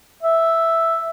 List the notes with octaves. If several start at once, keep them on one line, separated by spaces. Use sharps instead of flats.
E5